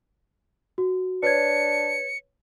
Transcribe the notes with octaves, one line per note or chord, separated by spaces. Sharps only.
F#4
D4 B4 C#5 G#6 C#7